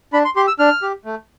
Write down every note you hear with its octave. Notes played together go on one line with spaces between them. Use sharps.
D4 B5
C6
G4 C6
E6
D4 F6
G4
A3